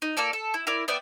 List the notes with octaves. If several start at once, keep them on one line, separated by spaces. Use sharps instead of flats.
D#4
A#3 F4 A4 D5
A4
E4
E4 A#4 D5
B3 D5 E5 G5